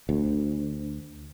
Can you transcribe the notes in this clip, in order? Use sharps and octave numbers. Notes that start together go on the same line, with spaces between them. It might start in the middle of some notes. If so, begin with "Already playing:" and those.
D2